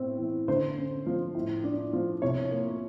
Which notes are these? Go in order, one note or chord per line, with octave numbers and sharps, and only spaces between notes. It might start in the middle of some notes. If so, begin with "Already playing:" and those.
Already playing: A2 C4
E3
D3 C5
C#4
F3
A2
D4
F3
C2 C#5
A#3